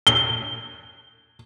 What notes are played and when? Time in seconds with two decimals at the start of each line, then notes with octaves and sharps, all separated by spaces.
0.07 G7